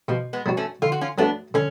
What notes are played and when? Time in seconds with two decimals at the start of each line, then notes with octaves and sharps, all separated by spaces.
0.08 B2 F3
0.33 G#3 B3
0.46 F#3 B3 D4 F#4
0.57 A3 C#4
0.82 D3 F4
0.92 F#4
1.01 C#4 F4
1.18 F#3 A3 B3 D4
1.54 D3 C#4